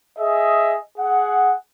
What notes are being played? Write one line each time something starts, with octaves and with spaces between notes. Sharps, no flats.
G#4 D#5 E5
G#4 F#5